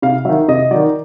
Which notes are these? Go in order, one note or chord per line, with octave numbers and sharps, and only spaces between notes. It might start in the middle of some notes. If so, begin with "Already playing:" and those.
C3 F5
D#3 F#3 E5
C3 D#5
D#3 F#3 D5